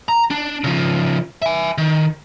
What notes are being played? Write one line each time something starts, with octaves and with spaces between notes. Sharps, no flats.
A#5
D4
C#3 F3
E5 G#5
D#3